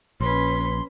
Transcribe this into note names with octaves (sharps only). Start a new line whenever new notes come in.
A#1 C#4 B4 C6